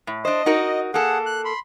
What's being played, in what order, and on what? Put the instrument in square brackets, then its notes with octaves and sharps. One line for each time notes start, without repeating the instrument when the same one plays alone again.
[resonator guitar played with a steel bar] A2
[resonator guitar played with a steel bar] D4 C5 [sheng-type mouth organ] D#5
[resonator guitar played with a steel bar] D#4 F#4 A#4
[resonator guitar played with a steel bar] A#3 A4 [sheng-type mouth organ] G#4 F#5
[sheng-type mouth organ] F#6
B5 C6